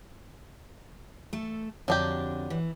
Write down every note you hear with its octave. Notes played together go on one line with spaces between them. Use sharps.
A3 A4
F2 D3 F#3 D4 G4
E3